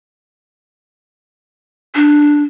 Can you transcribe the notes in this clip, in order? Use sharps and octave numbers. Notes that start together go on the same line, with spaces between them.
D4